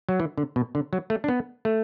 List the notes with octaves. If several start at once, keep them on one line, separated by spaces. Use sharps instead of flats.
F#3
E3
D3
B2
D3
F#3
A3
D4
B3
A3